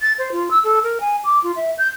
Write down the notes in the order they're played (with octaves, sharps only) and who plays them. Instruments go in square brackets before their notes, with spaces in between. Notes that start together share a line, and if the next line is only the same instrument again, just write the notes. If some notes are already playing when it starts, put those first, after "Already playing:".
[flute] A6
C5
F4
E6
A4
A#4
G#5
D6
F4
E5
G6